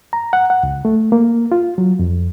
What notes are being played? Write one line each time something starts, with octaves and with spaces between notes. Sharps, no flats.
A#5
F#5
F#5
C#2
A3
A#3
F4
F#3
F2